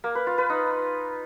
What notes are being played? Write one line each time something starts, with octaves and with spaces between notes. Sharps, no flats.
A#3
B4
F4
B4
D#4